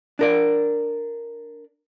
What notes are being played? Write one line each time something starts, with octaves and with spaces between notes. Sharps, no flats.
D4 A#4 D5